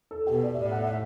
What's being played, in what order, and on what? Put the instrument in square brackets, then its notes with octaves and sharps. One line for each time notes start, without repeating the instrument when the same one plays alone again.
[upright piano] A4
[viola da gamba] B2 [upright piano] G4
[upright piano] D5
E5
[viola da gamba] A2 [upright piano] D5
[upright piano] F#5
E5